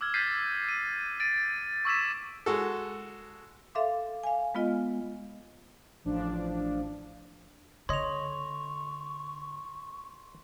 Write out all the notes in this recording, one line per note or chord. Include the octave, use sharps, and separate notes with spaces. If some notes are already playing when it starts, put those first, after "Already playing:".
D6 E6 F6 G#6
G6 A6 B6 C7 D#7
D#7
A6 D7 D#7
C#6 D6 E6 G#6 B6 E7
G#3 F#4 A4
A4 E5 F5 C6 D6
F5 G#5
G#3 B3 F4 D#5
A1 F3 D4
D3 C#5 D#5 C6 C#6 F7